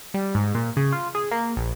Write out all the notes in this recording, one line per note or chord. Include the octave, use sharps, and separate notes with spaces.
G3
G#2
A#2
C#3
F4
G#4
A#3
A#1